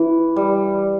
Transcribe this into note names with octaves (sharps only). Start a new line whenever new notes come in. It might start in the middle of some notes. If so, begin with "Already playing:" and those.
Already playing: E3
G3